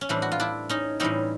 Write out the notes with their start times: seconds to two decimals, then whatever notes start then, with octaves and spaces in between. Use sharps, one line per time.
0.01 C#4
0.09 A2 E3 G3 C4 D4
0.22 F#4
0.32 F4
0.40 D4 E4
0.69 C#4 D#4
1.00 A2 E3 G3 C4 C#4 D#4